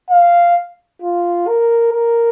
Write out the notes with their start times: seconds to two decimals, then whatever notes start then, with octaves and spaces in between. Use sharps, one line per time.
0.10 F5
1.02 F4
1.48 A#4
1.93 A#4